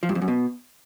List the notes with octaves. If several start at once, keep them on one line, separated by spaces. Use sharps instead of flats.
F3
G2
F2
F#2
B2